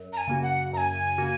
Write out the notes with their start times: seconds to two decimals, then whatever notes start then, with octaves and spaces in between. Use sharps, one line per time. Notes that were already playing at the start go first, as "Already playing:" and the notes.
Already playing: F#2
0.13 A#5
0.18 G#5
0.28 C#3 A#3 F#4
0.43 F#5
0.73 F#2 G#5 A#5
1.18 C#3 A#3 F#4